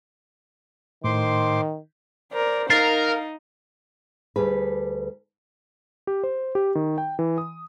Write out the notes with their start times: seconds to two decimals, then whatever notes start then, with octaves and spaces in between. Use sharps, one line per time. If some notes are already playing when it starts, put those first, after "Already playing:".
1.04 A2 D#3 C5 C6 D6
2.33 A#4 C5 D5
2.70 D#4 A#4 F5 A6 C7
4.36 D2 G3 G#4 B4
6.07 G4
6.24 C5
6.55 G4
6.75 D#3
6.98 G5
7.19 E3
7.38 D#6